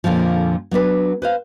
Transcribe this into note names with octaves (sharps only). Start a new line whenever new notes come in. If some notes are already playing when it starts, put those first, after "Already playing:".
F2 A#2 D3 F3
F#3 B3 D4 B4
B4 C5 F5